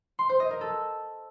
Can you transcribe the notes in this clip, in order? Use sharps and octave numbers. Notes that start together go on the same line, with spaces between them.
C6
C5
D#5
A#4
A4